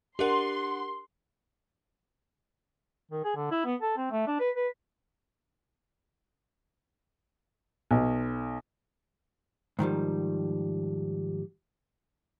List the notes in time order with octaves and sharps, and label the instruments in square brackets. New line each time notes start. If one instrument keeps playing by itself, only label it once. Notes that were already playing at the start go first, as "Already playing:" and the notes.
[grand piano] D4 F#5 [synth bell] G4 A#4 [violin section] C6
[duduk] D#3
G#4
D3
E4
B3
A4
C4
A3
D4
B4
B4
[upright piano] B1
[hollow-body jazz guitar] G#2 D#3 F3 G3